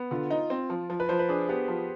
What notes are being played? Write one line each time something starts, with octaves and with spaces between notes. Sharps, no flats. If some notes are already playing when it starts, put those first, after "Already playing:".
Already playing: B3
D3 F4
D#4
C4
F3
F3
B4
F3 C5
B4
D4 G#4
B3 G4
F3